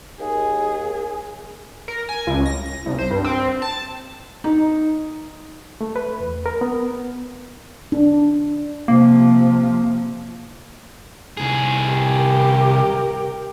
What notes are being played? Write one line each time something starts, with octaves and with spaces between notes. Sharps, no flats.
D#2 G#4
A#4
G#5
C#2
A#6
A#6
C2
C5
G2
C4
A5
D#4
A3
B4
E2
A#4
B3
D4
C3 F3 A#3
C2 G#4
G4 A#4